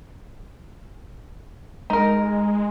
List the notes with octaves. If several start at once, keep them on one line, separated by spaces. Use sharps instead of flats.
G#3 D#4 A#4